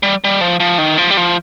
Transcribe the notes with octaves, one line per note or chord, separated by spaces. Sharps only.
G3
G3
F3
F3
D#3
F3
G3
F3